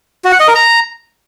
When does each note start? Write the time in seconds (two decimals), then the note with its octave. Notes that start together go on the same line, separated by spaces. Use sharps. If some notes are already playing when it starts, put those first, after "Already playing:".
0.24 F#4
0.32 F#5
0.40 D#5
0.48 A#4
0.55 A#5